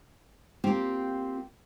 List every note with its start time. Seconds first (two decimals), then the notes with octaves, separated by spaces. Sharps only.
0.64 A#3 C4 F4 G4